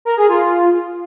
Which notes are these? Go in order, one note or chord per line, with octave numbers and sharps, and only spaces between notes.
A#4
G#4
F4